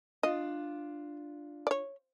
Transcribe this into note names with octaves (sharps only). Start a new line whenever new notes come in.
D4 F4 D#5
C#5 D5